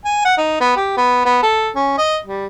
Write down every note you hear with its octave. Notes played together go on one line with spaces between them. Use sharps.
G#5
F#5
D#4
B3
G4
B3
B3
A4
C#4
D#5
G3